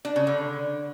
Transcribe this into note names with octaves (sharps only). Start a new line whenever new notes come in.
D4
C#3
D3